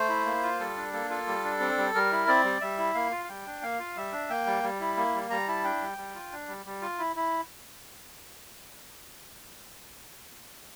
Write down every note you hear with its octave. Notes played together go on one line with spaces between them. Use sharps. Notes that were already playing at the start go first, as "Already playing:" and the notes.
Already playing: A3 C5
E4
A#3
F4
G3 A4
D4
A#3 A4
F4 A4
G3
D4
C4
G3
G3 A#4
E4
C4 D5
G3
G3 E5
E4
A#3 F5
F4
F5
G3 G5
D4
A#3 F5
F4
G3 E5
D4
A#3 G5
G3
G3
E4
A#3
G3
G3 A#5
E4 A5
D4 G5
G3
G3
F4
D4
G3
G3
F4
E4
E4